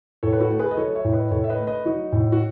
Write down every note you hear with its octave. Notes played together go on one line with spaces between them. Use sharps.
A2 A4 C#5
B4
F#4 A4
A3
G#4 B4
D#5
F#3 A4 C#5
C#5 E5
A2
B4 D#5
A2 A4 C#5
E5
B4 D#5
A3
B4 D#5
F#3 D#4 F#4
A2
F#4